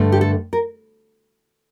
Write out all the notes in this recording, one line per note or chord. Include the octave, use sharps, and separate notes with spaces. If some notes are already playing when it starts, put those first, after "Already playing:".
Already playing: G2 D3 A3
G4
A4
A#4